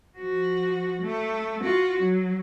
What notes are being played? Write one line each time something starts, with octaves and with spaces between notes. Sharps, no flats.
F3 F#4
A3
F4 F#4
F#3